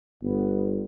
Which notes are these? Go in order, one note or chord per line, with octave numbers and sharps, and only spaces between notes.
G1 B3